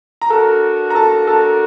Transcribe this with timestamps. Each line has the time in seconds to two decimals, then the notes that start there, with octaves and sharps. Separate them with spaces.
0.21 A#5
0.30 D4 F#4 A4 A#4 A5
0.90 A#5
0.95 A4 A5
1.27 A4 A5